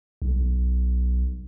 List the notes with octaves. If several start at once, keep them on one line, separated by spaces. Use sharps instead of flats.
B1